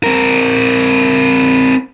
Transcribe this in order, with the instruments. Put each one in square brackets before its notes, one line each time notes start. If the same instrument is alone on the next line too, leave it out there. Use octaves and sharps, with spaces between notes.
[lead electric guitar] C4 A#4